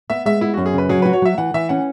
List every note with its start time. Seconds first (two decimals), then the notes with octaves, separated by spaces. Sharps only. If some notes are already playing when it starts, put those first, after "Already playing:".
0.10 B3 E5
0.25 G#3 E5
0.41 B3 E4
0.54 F#4
0.57 F#2
0.66 G#4
0.74 C#3 B4
0.89 F#3 G#4
1.02 F#4 B4
1.13 C#5
1.22 F#3 E5
1.38 E3 F#5
1.54 E3 E5
1.69 C#4 F#5